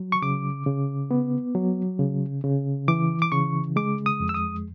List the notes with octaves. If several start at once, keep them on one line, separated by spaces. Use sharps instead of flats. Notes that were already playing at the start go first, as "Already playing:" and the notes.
Already playing: F#3
C#6
C#3 D6
C#3
B3
F#3
C#3
C#3
E3 D6
D6
C#3 C#6
G#3 D6
D#6
F2
E6
D#6